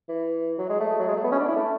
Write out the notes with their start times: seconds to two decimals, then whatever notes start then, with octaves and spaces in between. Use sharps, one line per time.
0.09 E3
0.58 F#3
0.69 G#3
0.80 A3
0.99 F#3
1.08 G#3
1.16 A3
1.24 B3
1.32 C#4
1.39 D4
1.48 E4
1.56 A3